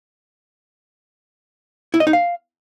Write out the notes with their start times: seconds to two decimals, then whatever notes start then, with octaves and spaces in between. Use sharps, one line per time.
1.94 E4
2.00 D#5
2.07 D#4
2.13 F5